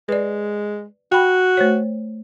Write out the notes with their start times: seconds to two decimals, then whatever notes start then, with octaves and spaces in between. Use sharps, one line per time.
0.09 G#3 B4 D5
1.12 F#4 G5 B5
1.57 A3 C5 C#5